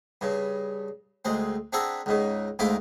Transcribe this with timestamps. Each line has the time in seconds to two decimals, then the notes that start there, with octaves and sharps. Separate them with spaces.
0.21 G2 C#3
1.25 D2 G#3 C4
1.73 C4 D4 G#4 E5 F#5 A#5
2.06 C#2 G#2 C#3
2.59 D2 G#2 C4 E4 F4 D6